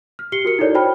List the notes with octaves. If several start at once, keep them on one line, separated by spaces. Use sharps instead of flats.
F6
G4 C7 C#7 G7
F#4 A#4 C#7
D#4 E4 A4 A#4 C#5 D5
F#4 C5 G5 A5 B5 F6